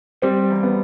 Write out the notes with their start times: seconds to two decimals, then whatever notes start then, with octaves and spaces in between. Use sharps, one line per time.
0.22 G3 C4
0.50 E2
0.63 B3